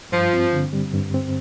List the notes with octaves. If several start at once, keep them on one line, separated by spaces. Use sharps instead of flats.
G2 F3
C4
D3
G3
G2
C4